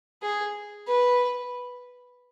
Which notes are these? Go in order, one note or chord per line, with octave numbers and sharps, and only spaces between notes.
G#4
B4